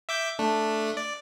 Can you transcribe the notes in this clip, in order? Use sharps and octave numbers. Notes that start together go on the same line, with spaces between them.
E5 D6 G6
A3 D4
D5